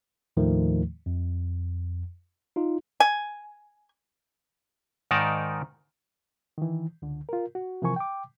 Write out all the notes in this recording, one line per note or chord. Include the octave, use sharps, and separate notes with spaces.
D#2 A2 D#3 F3 A3
F2
D#4 F4
G#5
G#2 D#3 D#4 A#4 D5 A5
D#3 E3
C#2 D3
F4 A#4
F#4
C3 E3 F3 A#4 G#5 C#6
G5 D6